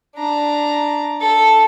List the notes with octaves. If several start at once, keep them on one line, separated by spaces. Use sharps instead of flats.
D4 A#5
A4